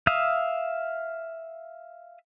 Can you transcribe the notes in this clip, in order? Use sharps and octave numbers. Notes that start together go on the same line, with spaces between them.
E5 F5 D#6